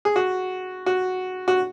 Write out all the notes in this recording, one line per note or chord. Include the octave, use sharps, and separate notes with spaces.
G#4
F#4
F#4
F#4